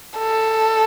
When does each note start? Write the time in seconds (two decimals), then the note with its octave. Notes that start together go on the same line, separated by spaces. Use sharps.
0.18 A4